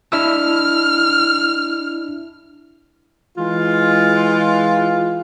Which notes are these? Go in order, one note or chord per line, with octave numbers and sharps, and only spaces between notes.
D4 E4 E6 F6
E3 G#3 F4